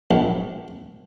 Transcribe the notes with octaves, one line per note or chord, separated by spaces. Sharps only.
A#1